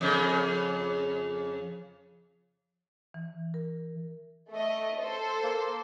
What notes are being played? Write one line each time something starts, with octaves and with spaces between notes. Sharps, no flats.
F2 C#3
E3
A#4
A3 D#5
A4 C5
A#3